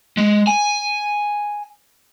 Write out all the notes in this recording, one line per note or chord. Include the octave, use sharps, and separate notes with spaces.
G#3
G#5